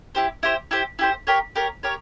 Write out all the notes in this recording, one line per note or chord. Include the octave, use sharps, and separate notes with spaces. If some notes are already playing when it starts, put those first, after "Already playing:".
E4 G4 C5
E4 G4 C5
E4 G4 C5
E4 G4 C5
G4 A#4 C#5
G4 A#4 C#5
G4 A#4 C#5